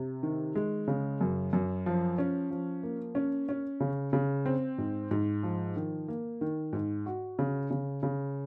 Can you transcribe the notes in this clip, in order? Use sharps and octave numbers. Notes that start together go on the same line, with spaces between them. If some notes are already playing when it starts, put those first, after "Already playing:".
Already playing: C3
D#3
G#3
C#3
F#2
F#2
F3
C#4
F3
A#3
C#4
C#4
C#3
C#3
C4
G#2
G#2
F3
D#3
A#3
D#3
G#2
F#4
C#3
C#3
C#3